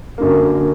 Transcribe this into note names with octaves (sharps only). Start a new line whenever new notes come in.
F#2 D3 A#3
D3 A#3